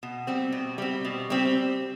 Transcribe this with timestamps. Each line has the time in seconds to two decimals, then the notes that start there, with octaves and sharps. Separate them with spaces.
0.03 B2
0.27 G3 C4
0.53 B2
0.78 G3 C4
1.05 B2
1.30 G3 C4